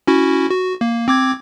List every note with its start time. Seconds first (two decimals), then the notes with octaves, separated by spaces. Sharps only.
0.07 C#4 E4 F#4
0.51 F#4
0.81 A#3
1.08 C4 D6 G#6